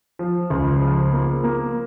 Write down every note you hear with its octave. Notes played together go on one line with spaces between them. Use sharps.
F3
C#2
F3
A#3
A#3